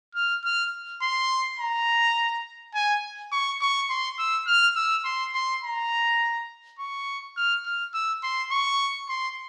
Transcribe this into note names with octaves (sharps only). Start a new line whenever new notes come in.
F6
F6
C6
A#5
G#5
C#6
C#6
C6
E6
F6
E6
C6
C6
A#5
C#6
F6
F6
E6
C6
C#6
C6